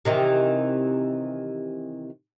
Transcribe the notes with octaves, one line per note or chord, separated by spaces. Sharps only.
C3 D#3 E3